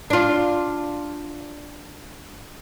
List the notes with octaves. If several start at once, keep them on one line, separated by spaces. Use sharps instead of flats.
D4 F4